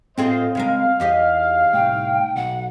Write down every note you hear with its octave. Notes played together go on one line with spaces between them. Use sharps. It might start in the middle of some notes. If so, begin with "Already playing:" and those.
A2 C4 F4 G#4 C5 D#5 G5
C#3 G#3 A#4 F5
E2 D#4 G4 D#5
C2 A2 G5
B1 F#5